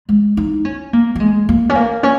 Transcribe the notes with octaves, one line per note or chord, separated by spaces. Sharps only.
G#3
D#4
C#4
A#3
A#3
G#3
A#3
C#4
A#3
C#4